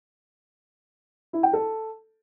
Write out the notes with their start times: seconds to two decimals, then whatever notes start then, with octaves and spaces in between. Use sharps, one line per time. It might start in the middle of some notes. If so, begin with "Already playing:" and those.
1.33 E4
1.43 G5
1.53 A4